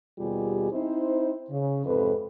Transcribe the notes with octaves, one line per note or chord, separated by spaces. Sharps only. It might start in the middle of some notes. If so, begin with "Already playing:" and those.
D#2 B2 G3 F4 G4 G#4
C4 D#4 E4 C5
C#3
F2 G#2 C3 A4 B4